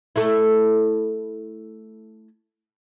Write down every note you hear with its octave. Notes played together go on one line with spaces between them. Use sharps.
A3 E4